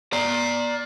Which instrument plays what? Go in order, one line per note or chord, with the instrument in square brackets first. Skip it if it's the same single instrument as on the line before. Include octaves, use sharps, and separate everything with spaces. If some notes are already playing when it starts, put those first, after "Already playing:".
[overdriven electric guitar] D5 A#5